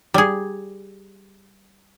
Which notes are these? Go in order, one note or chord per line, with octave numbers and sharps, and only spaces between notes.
G3 G#4